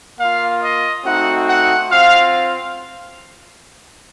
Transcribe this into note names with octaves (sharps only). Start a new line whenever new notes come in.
A#3 F4 F5
D#5
A3 C4 D#4 F#4 F#5
F#5
C4 F4 F5